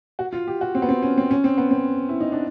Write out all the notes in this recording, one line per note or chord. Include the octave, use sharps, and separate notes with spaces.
F#4
F4
G4
F#4
C4
B3
C4
C#4
C4
C#4
C4
B3
C4
E4
D#4
D4